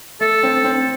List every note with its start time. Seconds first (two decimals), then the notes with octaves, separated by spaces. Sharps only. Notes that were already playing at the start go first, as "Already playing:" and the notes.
0.21 A3 A4
0.43 C4
0.64 C4